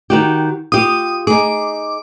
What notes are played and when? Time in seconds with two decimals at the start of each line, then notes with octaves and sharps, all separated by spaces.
0.10 D#3 F#4 G4
0.72 F4 G4 D#6
1.27 D#4 G#4 D6